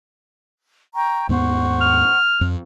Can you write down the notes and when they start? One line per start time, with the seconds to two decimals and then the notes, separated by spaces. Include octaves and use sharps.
0.95 G5 A#5 C#6
1.29 D#2 G#2 B3 C5 F#5 C#6
1.81 F6
2.41 F2